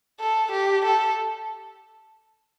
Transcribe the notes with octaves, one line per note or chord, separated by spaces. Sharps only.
A4
G4
A4